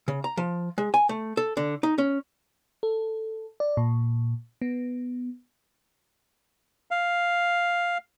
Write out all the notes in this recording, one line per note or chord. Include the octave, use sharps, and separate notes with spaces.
C#3
A#5
F3
G#3
G#5
A3
A4
D3
D#4
C#4
A4
D5
A#2
B3
F5